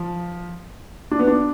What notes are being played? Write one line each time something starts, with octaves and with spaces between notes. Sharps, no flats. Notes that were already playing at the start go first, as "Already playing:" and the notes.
Already playing: F3
D4
B3
D4